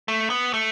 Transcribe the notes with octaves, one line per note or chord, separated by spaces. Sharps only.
A3
B3
A3